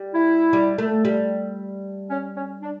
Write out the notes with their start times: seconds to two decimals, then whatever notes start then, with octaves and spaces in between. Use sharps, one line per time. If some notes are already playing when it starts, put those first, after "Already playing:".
Already playing: G3
0.14 E4
0.53 G3
0.78 A3
1.05 G3
2.10 C#4
2.36 C#4
2.62 D4